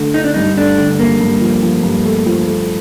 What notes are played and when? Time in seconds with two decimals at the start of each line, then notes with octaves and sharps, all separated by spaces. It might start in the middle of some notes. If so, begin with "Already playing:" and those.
Already playing: D3 A3
0.14 D3 D#4
0.24 D4
0.34 G2 D#4
0.57 A3 D4
0.78 D3
0.99 G2 A#3
1.21 G2
1.41 F3
1.63 F3
1.83 G2
2.05 A3
2.26 F3
2.47 A3